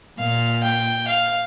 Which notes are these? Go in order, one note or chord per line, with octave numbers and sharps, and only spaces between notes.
A#2 F5
G5
F5